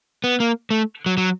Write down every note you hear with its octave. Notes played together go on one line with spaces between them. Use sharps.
B3
A#3
A3
F#3
F#3